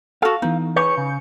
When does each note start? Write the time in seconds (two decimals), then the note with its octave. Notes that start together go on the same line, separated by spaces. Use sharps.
0.22 F#4 A4 F5
0.42 E3 B3 D#4
0.76 G#4 B4 C#5 G6 C#7
0.97 C#3